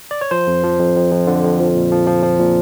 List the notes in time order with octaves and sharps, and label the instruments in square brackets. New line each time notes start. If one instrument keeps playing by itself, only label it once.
[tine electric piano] D5
C#5
F3 C5
F2
F3
F2
F2
F2
D3
F2
F3
A#2
F3
F3
F3
A#2